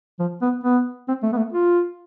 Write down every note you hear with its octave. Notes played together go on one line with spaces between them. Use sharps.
F3
B3
B3
C4
A3
B3
A3
F4